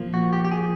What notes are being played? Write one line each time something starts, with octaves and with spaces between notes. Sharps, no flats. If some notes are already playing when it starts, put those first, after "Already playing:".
Already playing: A#2 F3 A#3
F#4
G4
G4
G#4